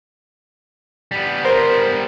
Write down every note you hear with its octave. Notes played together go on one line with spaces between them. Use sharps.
G3 B3
A#4 C5